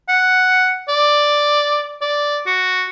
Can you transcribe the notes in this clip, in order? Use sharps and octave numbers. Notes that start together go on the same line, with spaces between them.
F#5
D5
D5
F#4